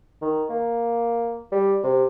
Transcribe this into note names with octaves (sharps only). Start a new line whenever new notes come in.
D#3
A#3
G3
C3